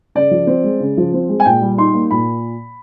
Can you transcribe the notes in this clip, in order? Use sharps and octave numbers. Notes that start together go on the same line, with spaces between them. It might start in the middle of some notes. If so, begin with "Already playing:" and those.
C#3 D5
F3
C4
G#3
C#3
F3
C4
G#3
G#5
A#2 G5
G3
D#4 C6
A#3
A#2 B5